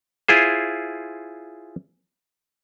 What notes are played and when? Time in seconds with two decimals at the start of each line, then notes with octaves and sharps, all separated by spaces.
0.28 E4 F4 G#4 C5